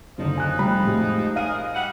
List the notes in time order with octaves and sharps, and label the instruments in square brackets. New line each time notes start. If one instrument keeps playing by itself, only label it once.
[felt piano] F#1 D3 [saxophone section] F3 D#4
[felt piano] G#5 F#6
F1 G3 B5
A2 G#3 G4
[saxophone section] G#4 A#4 D#5 [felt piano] F5 D#7
[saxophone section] G3 E5 F#5